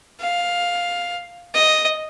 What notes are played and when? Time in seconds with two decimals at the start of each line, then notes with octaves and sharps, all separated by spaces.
0.20 F5
1.54 D#5